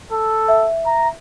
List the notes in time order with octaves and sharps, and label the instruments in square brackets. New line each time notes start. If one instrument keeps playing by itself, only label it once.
[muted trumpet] A4
[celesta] E5
[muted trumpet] A#5